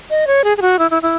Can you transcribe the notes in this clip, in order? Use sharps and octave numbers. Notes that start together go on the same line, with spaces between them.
D#5
C#5
G#4
G#4
F#4
E4
E4
E4